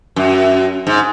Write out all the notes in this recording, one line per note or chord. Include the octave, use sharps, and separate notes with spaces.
F#2
G#2